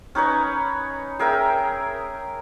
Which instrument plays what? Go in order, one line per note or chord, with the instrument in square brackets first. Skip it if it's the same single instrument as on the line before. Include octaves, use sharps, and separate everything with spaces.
[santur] C#4 D#4 B4 C#5
G#4 A#4 E5 G5